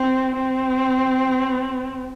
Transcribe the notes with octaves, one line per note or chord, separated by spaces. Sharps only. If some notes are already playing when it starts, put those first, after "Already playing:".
Already playing: C4
C4